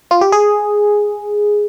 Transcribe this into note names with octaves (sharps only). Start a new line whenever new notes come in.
F4
G4
G#4